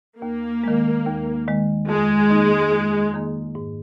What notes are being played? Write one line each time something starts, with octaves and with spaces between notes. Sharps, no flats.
D#2 A#3
D#3 G#3
D#2
D#3 G#3
F2 G#3
D#3 A#3 D#4
F2
D#3 A#3 D#4
G#2